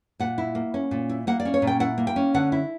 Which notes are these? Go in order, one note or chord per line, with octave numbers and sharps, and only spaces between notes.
A#2 F#5
E4
A#3
C#4
A#2
E4
A#3 F#5
D5
C#4
C#5
A#2
G5
E4 F#5
A#3
G5
C#4
D3 F#5
E4